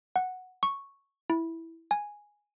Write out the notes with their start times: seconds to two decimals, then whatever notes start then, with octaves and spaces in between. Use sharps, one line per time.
0.16 F#5
0.63 C#6
1.30 E4
1.91 G#5